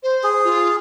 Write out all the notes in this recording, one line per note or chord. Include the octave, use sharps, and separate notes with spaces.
C5
G#4
F4